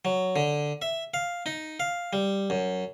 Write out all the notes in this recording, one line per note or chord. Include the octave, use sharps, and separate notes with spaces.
F#3
D3
E5
F5
D#4
F5
G3
F#2